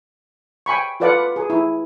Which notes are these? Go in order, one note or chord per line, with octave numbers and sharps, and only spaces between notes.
G5 G#5 B5 C#6
F4 A4 B4 D5 F5 F#5
G#4
E4